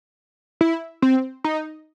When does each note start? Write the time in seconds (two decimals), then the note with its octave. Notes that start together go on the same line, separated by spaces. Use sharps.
0.61 E4
1.02 C4
1.44 D#4